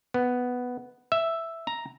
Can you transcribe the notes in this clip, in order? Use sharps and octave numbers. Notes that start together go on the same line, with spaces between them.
B3
E5
A#5